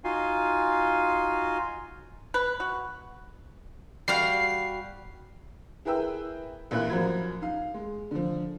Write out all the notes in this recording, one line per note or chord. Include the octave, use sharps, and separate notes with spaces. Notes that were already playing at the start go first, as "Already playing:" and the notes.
D#4 F4 F#4 F5 G#5 C6
B4
F#4
G3 F#4 F5 C7
E4 G#4 A#4 B4 G5 E6
A1 A#2 E4 B5 F#6
F#2 F3 F#4 A#4 B5 G#6
D#4 F5
G#3
D3 F3